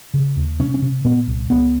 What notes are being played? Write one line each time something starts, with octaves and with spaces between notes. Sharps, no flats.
C#3
D#2
C3 C#4
C#4
C3
A#2 B3
C2
C#2 B3